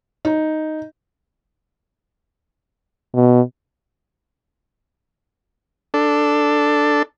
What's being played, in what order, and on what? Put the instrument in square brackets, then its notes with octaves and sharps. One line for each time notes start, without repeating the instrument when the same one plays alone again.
[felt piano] D#4
[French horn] B2
[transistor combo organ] D4 A4